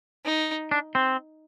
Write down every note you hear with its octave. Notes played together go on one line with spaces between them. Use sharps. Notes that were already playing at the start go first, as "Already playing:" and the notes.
D#4
D4
C4